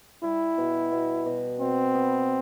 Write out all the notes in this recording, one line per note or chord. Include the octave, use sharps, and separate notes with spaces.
G3 E4
B2
B2
B2
B2 C4
B3